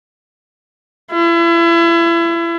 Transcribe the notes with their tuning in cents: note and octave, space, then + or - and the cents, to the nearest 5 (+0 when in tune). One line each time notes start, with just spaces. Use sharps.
E4 +35